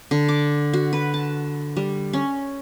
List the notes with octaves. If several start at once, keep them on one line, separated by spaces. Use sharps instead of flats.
D3
D6
F#4
B4
A5
G3
C#4